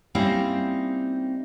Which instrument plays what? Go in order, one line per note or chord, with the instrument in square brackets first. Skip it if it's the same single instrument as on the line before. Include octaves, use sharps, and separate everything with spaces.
[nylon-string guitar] G3 A#3 C4 C#4 D#4 E4